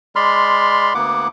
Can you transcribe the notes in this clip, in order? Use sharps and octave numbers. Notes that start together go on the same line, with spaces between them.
G#3 D5 B5 C6 F6
D2 A#3 B3 F#5 D6